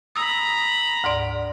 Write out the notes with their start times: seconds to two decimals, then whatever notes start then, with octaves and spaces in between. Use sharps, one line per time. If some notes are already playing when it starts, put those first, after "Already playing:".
0.16 A#5 B5 D#6 E6
1.04 D2 G#2 D5